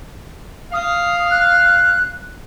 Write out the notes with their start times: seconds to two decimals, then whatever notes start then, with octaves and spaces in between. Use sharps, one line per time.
0.73 F5 D#6
1.30 F#6